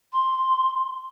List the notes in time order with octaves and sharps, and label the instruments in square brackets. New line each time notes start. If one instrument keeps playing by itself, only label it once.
[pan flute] C6